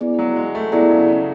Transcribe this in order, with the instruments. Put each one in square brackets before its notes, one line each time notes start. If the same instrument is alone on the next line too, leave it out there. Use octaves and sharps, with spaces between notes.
[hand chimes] B3 E4 G#4 D5
[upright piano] F#3
G#3
A3
[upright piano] F#3 [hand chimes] B3 E4 G#4 D5
[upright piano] C#3
C#3